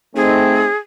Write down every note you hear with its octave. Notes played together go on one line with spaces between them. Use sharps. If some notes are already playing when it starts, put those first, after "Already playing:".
A3 C4 D#4 G#4